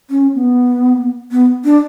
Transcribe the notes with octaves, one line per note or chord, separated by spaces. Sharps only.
C#4
B3
B3
D4